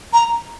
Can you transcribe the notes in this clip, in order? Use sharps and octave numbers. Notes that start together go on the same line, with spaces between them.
A#5